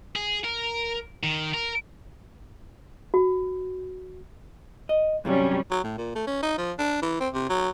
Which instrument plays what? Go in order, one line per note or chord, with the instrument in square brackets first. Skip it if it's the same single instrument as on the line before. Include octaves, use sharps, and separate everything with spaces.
[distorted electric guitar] G#4
A#4
D#3
A#4
[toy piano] F#4
[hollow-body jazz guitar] D#5
[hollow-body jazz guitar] G2 C3 F#3 [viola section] G3 C#4
[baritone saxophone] F#3
A2
A#2
A3
C#4
D#4
F3
D4
E3
C4
C3
F#3